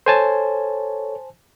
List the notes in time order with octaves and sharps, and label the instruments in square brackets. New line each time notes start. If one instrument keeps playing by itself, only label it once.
[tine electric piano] A4 C#5 [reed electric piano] C5 G#5 A5